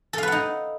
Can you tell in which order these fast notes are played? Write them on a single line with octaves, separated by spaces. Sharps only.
A4 F5 B4 F#5 D#4